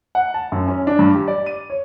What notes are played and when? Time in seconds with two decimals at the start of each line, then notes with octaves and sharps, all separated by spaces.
0.15 F#5
0.34 A5
0.52 F#2
0.68 C#4
0.87 D4
0.99 G2
1.15 G4
1.28 D5
1.46 D#7
1.70 C#5